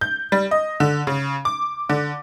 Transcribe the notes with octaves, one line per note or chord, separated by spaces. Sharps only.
G6
G3
D#5
D3
C#3
D6
D3